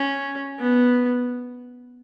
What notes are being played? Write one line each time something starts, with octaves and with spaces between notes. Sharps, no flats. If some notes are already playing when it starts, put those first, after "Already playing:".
Already playing: C#4
B3